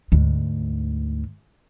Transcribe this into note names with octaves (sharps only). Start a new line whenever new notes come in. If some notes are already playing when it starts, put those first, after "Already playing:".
D2 G#2